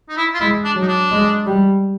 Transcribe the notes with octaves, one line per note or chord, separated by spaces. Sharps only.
D#4
E4
F4
G#3 E4
D4
F#3
D#4
D4
G#3
G3